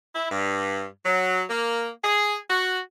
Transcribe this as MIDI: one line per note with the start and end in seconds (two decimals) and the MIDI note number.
0.15 0.29 64
0.32 0.85 43
1.06 1.44 54
1.50 1.90 58
2.04 2.37 68
2.50 2.80 66